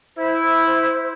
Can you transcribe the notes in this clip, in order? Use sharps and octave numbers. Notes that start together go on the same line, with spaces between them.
E4 C5